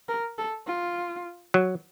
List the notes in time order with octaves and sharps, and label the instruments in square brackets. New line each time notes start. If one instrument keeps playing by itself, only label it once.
[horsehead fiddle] A#4
A4
F4
[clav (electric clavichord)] F#3